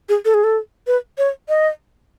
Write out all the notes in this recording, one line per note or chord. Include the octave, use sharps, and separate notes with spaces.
G#4
A4
G#4
A4
B4
C#5
D#5